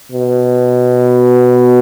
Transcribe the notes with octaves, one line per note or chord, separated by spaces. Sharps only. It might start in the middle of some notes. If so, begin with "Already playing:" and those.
B2